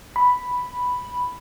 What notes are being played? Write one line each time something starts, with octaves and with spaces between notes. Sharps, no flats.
B5